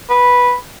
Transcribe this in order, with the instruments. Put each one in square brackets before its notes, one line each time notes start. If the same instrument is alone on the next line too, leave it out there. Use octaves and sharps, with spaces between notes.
[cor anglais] B4